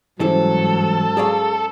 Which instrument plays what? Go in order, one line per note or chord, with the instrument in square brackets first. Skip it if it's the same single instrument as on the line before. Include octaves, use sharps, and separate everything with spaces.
[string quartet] G#2 F#3 [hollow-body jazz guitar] E3 G3 E4 [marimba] C#4 C5 [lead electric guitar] A4
[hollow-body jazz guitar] G#4 D5 F5 [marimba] A#5 C#6